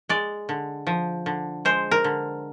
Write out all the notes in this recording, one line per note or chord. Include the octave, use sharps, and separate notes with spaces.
G#3 D5
D3
F3
D3
G#3 C5
A#4
D3